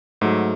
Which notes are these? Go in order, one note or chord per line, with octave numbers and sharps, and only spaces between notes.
G#2 F#3 A3